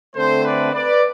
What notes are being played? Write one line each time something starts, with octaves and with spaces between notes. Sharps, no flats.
D3 A3 C4 A4 C5
B4 D5
B4 D5